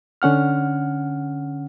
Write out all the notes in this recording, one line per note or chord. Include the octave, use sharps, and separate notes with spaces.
D3 C#4 F#5 F6